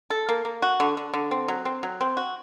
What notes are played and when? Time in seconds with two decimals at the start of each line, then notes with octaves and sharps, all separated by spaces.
0.10 A4
0.29 A#3
0.45 A#3
0.62 F#4
0.80 D3
0.97 D3
1.14 D3
1.31 C4
1.48 F#3
1.65 C4
1.83 F#3
2.01 C4
2.17 F#4